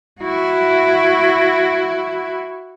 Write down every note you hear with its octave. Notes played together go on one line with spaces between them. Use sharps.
E4 F#4